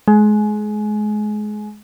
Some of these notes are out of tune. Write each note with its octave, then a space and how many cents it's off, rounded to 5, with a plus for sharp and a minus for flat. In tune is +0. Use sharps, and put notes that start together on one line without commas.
G#3 +25